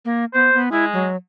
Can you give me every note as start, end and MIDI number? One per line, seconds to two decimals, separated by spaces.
0.05 0.25 58
0.34 0.50 59
0.34 0.59 72
0.54 0.69 59
0.72 1.05 56
0.72 0.85 64
0.93 1.16 54